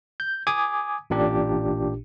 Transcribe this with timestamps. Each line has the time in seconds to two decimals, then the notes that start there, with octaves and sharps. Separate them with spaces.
0.20 G6
0.47 G#5 D6 D#6 G#6
1.10 A1 A#2 D4 G4